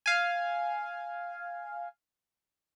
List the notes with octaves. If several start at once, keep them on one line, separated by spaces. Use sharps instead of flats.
F5 G#5